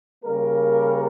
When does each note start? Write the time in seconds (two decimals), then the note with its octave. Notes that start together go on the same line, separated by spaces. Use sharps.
0.24 C#3 G3 A#3 A#4